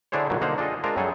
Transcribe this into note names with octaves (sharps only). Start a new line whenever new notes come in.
D3 D4 E4 G#4 C5 C#5
G2 A#2 D#3 F#3
D3 A#3 D#4 C5 F#5 A#5
D4 F4 G#4 A4 D#5
G#3 D4 F4 A#4 C5
F#2 F#3 G3 G#4 A4